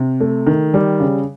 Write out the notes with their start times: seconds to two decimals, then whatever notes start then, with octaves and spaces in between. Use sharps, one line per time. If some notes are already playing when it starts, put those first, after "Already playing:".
Already playing: C3
0.20 A3
0.47 D#3
0.74 G3
1.00 C#3